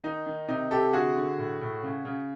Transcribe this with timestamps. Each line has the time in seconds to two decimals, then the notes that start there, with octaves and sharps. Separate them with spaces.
0.04 D#3 D#4
0.26 D#3
0.48 C3 D#4
0.71 C3 G4 A4
0.93 D3 F#4 G#4
1.16 D3
1.38 A2
1.61 A2
1.83 C#3
2.05 C#3